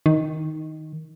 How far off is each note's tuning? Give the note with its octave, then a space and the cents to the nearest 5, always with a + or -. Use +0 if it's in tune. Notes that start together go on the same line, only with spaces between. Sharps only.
D#3 +5